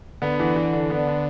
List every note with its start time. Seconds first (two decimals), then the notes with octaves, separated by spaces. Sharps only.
0.22 D3 B3
0.40 E3
0.56 E3
0.73 D4
0.90 B3
1.07 D4